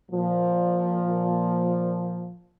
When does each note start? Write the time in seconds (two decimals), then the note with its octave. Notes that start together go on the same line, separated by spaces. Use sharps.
0.11 A#2 F3